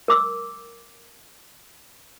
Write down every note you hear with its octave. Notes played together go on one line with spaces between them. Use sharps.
A#4 D6 E6